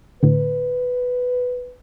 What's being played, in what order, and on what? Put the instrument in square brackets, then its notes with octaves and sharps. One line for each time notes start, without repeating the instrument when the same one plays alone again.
[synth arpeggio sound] A2 D3 [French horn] B4